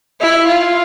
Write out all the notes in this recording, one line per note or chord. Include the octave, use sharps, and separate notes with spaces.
E4
F4